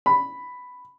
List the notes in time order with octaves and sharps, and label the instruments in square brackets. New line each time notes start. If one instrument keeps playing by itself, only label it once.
[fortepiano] B5